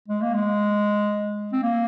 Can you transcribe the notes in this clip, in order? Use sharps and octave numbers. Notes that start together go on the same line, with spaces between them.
G#3
A#3
G#3
C4
A#3